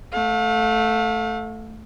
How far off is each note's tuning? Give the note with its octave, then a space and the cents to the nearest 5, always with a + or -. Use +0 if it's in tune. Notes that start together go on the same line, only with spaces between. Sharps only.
A3 +0 F5 +40